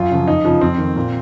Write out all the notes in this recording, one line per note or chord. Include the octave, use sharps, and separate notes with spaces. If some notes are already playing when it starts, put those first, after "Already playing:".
Already playing: F#2 F4
C#3 F3
F2 D#4
C#3 F3
F2 C4
D#3
A#2